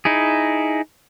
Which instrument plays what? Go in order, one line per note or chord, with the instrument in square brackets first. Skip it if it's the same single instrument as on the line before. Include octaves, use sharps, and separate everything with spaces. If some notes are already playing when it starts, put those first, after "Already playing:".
[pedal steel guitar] D#4 E4 G#4